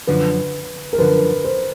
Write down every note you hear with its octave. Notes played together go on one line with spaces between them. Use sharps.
F#2 D3 F3 B4
A#4
F#2 D3 F3 B4
C5